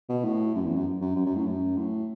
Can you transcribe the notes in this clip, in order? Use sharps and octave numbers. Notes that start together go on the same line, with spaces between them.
B2
A2
F#2
E2
F#2
F#2
F#2
F#2
A2
F#2
A2